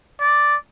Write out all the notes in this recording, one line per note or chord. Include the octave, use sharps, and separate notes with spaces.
D5